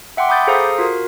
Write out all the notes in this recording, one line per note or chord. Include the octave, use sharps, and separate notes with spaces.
E5 F#5 G5 C6 D6
B5 D6 D#6 G6 A6
G#4 A4 C5 F5 A#5 D#6
F4 F#4 A#4